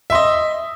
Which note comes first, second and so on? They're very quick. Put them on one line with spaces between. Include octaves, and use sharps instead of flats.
E5 C6 D#5